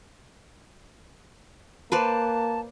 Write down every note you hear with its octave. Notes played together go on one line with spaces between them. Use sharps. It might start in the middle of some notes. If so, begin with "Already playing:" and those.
A#3 B4 C5 D5 A5